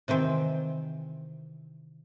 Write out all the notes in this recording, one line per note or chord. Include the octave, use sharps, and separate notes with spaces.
C3 D#3 E3 C4